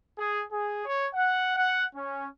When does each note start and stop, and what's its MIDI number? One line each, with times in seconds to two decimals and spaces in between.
0.18 0.43 68
0.51 0.83 68
0.86 1.05 73
1.15 1.56 78
1.57 1.84 78
1.96 2.26 61